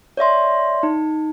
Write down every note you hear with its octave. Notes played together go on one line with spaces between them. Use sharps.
C#5 D5 E5 C6
D#4